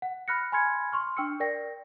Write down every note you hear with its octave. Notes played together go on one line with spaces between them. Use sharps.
F#5
B5 F6 F#6 A#6 C#7
G#5 B5 C6 F6 G#6 C#7
C6 C#6 F6
D4 G5 C#6 E6 F6 C#7
A#4 D5 G5 A#6